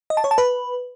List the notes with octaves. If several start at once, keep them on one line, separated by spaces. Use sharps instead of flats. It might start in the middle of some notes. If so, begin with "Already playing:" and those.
D#5
A5
C#5
A5
B4